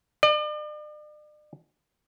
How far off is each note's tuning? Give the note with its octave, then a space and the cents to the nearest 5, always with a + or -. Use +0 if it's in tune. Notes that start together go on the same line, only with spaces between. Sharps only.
D5 +40